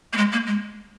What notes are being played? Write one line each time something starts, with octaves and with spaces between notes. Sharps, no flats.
A#3
G#3
A#3
G#3